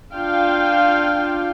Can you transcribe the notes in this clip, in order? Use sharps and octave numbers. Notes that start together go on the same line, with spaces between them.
D4 F4 F5 G5